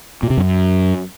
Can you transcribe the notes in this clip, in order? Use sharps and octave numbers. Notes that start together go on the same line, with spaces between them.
A#2
C3
F#2